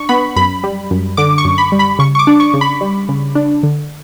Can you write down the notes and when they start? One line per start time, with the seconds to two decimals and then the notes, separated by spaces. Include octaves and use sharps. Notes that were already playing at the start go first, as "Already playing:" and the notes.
Already playing: D4 C#6
0.09 B3 B5
0.36 F#2 B5
0.63 G3
0.91 F#2
1.17 D3 D6
1.38 C#6
1.45 F#2
1.58 B5
1.72 G3
1.79 B5
1.99 C#3 C#6
2.15 C#6
2.19 D6
2.27 D4
2.40 C#6
2.54 C#3
2.61 B5
2.81 G3
3.09 C#3
3.35 D4
3.63 D3